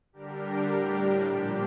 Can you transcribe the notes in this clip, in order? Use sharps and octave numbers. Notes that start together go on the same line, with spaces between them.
D3 G3 D4 G4 A#4
A2 G3 D4
A#2 F3 A#3 D4 G4